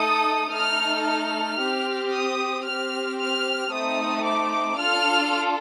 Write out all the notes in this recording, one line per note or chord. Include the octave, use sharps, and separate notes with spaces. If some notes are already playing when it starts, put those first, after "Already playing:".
Already playing: A3 D#4 A4 D#6
A3 D#4 A4 F6
F6
C4 G4
D#6
C4 G4 F6
F6
A3 C4 D#4 D#6
D6
D4 F4 A4 F6